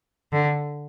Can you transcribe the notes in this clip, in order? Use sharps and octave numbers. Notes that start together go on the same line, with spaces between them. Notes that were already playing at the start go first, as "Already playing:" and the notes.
D3